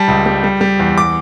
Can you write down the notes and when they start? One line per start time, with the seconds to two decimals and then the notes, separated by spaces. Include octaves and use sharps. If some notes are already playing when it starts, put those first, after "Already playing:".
Already playing: G3 A5
0.08 C#2
0.26 G3
0.44 G3
0.61 G3
0.79 E2
0.98 D6